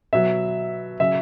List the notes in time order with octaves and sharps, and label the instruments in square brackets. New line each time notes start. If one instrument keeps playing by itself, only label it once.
[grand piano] B2 F#3 E5
C#3 F#3 E5